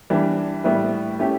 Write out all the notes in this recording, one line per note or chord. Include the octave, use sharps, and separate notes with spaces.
E3 G3 D4
A2 G3 B3 E4 B4
A3 C#4 E4 G4